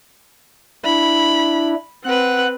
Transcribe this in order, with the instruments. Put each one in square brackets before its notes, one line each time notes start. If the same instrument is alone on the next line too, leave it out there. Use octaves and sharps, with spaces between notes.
[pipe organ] D4 E4 [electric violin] B5
[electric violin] C4 B4 [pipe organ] F#5 F#6